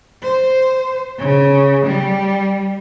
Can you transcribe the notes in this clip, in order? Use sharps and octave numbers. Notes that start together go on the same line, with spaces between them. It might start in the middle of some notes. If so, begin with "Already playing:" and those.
C5
C#3
G3